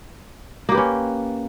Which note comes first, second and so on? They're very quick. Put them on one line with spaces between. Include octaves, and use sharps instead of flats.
A#3 G4 B4 C#4